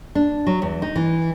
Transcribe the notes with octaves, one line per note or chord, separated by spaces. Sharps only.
D4
F#3
E2
D#4
E3